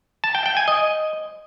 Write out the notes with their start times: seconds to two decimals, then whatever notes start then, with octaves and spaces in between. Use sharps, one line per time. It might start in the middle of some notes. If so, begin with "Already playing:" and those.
0.24 A5
0.35 G5
0.46 G5
0.57 G#5
0.68 D#5